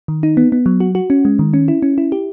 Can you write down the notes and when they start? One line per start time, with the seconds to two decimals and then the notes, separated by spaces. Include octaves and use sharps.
0.08 D#3
0.23 D#4
0.37 B3
0.52 B3
0.66 F#3
0.80 F#4
0.95 F#4
1.10 C#4
1.25 G#3
1.39 D#3
1.54 C#4
1.68 E4
1.82 C#4
1.98 E4
2.12 G4